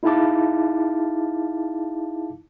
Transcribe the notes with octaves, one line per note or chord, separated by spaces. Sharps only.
D#4 E4 G#4 F5 A5 D6